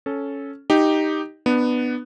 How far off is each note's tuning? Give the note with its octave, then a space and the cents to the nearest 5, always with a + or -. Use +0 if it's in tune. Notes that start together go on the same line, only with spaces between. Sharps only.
C#4 +0 A4 -10
D#4 +0 G4 +0
B3 +0 D4 +30